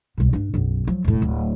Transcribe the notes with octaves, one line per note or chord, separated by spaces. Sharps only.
C2 B2
G2 D4
B1 F#2
F3 F#3
E1 A2
D1